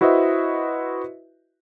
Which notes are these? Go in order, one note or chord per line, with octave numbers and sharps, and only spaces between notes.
E4 F#4 B4 C5 D#5 E5